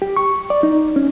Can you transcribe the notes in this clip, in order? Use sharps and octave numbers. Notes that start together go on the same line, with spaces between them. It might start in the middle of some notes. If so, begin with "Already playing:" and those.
G4
C#6
D5
D#4
C#4